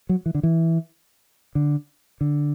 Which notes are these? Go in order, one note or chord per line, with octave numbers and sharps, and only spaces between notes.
F#3
E3
D3
E3
D3
D3